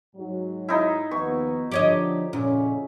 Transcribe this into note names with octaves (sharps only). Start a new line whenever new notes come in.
G#2 F#3
D#4 E4
D#2 F3 B3 C#6
D3 F3 G4 C#5 D#5
F2 A#2 C#3 C#4